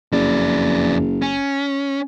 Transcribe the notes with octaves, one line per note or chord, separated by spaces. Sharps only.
F#1 F2 D5
C#4